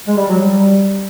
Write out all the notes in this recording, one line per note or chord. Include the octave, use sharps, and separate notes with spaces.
G#3
G3
F#3
G3